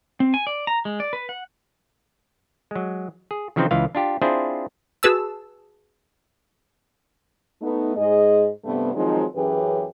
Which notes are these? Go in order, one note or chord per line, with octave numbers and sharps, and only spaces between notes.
C4
G#5
D5
A#5
G#3
D5
B4
F#5
F#3 G#3
G#4
C#3 E3 F3 C4 D#4 C5
C#2 E3 F4 F5
D4 F4 G4
C4 D4 E4 F4 G#4 C5
F#4 G#4 B4 A5 E6
A3 B3 D#4
G#2 G#4 D#5
G2 C3 A3 B3
D#3 F3 F#3 G#3 C4 D#4
F#2 E3 C#4 G4 G#4 B4